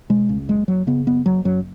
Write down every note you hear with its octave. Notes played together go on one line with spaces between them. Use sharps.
B2 G#3
C#2
F#1 G#3
F#1 F#3
C#3 B3
F#1 B3
F#1 F#3
F#2 F#3